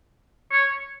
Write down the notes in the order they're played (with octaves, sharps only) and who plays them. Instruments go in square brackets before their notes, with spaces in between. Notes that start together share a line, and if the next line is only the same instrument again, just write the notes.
[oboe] C#5